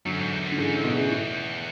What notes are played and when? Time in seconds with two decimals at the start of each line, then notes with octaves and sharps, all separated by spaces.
0.05 F#2 D3 F#3
0.19 G#2
0.32 E2
0.46 F#2
0.52 D3
0.58 G#2 C#3 E3
0.73 F#2 A2
0.84 B2
0.93 E2 A2 C#3
1.11 A2